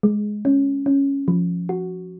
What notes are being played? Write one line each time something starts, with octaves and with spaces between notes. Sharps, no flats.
G#3
C#4
C#4
F3
F#4